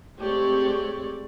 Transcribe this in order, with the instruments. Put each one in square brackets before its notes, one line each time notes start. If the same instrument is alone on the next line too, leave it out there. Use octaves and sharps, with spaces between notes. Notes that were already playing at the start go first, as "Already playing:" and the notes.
[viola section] G#3 A3 C4 G4 C#5 D5